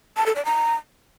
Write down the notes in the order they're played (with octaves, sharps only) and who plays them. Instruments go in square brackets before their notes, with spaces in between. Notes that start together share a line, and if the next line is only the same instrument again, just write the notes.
[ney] A5
A4
D5
A#5